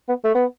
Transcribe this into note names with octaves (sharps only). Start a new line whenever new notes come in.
B3
A3
B3